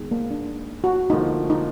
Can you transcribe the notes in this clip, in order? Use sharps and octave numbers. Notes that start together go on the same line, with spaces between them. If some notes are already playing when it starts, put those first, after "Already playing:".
Already playing: D#3 G#3 B3
A#3
D4
F#4
D2 D3 F3 A#3 D#4 F4
D#4